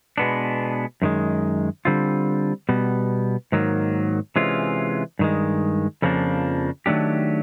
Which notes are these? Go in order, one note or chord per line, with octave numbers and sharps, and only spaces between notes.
B2 G#3 B3 D4
F#2 D#3 G#3
D3 G3 C4 F4
B2 G3 B3
G#2 D#3 F#3 A#3
C3 E3 G#3 C#4 F4
G2 D#3 G#3
F2 C#3 F3 A#3 D4
D#3 F#3 A3 D4 G4